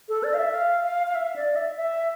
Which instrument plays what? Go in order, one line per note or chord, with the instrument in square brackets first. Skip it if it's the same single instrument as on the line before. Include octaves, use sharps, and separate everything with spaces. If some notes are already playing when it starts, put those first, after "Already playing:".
[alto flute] A4
D5
F5
E5
F5
F5
F5
E5
D5
E5
E5